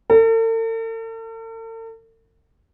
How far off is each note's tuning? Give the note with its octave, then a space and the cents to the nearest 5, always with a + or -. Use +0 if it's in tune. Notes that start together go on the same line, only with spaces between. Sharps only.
A4 +45